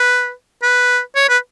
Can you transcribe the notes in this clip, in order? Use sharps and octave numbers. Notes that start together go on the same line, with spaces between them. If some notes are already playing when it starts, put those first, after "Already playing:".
Already playing: B4
B4
C#5
B4